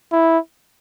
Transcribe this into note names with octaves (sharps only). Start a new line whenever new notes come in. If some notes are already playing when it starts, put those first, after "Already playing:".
E4